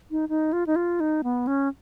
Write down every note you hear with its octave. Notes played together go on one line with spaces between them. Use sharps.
D#4
D#4
F4
D#4
F4
D#4
B3
C#4